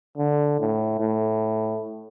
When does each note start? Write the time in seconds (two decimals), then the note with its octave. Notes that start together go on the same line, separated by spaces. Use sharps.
0.18 D3
0.60 A2
1.00 A2